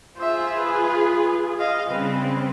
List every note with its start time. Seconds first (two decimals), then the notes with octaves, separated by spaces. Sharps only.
0.17 F4 G#4 C5 E5
0.56 B4
1.59 D#5 F5
1.90 C#3 G3 C4 B4